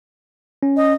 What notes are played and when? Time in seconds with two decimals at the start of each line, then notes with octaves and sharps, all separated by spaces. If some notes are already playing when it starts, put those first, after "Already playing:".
0.63 C#4
0.77 D#5